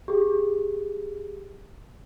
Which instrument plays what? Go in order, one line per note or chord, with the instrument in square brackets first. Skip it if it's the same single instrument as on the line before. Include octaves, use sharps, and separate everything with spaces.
[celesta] G4 G#4